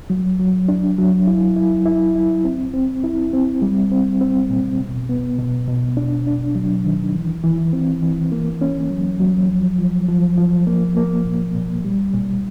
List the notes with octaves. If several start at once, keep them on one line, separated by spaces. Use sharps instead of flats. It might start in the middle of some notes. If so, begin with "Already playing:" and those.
F#3
F#3
D4
F#3
E4
E4
E4
E4
C4
C4
E4
C4
G3
C4
C4
A#2
B2
B3
B2
B2
D4
D4
F#3
D#3
E3
E3
C4
E3
A#3
C#4
F#3
F#3
F3
F3
F3
F3
A#3
A#3
A#2
A#2
G3
A#2